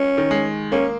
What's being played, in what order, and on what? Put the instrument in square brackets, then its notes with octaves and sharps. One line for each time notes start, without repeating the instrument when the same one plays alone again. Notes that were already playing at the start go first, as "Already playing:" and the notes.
Already playing: [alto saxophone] C#4
[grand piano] D#3
G#3
[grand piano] A#3 [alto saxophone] C#4